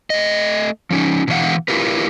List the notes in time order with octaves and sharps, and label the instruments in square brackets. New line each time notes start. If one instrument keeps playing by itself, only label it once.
[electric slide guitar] A3 D#5
F3 C#4 D#4
B2 D3 E3 C5 F5 F#5
E4 F4 G4 A#4 B4